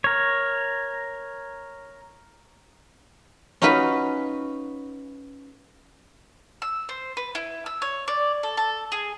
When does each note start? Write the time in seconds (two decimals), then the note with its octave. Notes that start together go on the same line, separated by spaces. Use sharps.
0.04 A#4 C#5
3.62 C#4 D#4 F4 F#4 B4
6.62 E6
6.89 C5
7.17 B4
7.35 E4
7.66 E6
7.82 C#5
8.08 D5
8.43 A4
8.57 A4
8.92 G#4